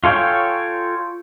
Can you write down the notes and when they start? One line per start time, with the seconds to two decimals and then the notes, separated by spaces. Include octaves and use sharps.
0.04 F4 A4 C#5 G5 G#5